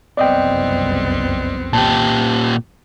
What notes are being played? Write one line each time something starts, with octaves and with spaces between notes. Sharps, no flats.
F#1 C2 F2 B3 C4 D5 D#5 G5
A#2 G4 A5